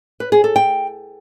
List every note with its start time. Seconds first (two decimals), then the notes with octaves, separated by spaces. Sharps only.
0.20 B4
0.32 G#4
0.44 A4
0.56 G5